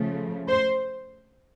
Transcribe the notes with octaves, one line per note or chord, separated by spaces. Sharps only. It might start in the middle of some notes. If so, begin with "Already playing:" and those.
Already playing: C#3 F3 A3
C5